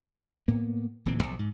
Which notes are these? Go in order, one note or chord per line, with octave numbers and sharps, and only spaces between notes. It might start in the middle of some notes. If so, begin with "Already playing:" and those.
A2 A#3 B3
D1 A#2 E3 C4
B1 F3
G#2